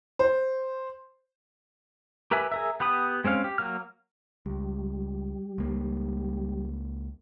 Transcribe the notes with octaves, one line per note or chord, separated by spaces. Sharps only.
C5
G4 A#4 B4 E5 G#5
G#4 A#4 E5
B3 G4 B5 D#6
G#3 C4 C#4 F5
G4
F#3 A#3 F6
C#2 G3
C#2 A#3